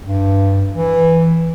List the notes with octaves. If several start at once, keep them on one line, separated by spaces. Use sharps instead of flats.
G2
E3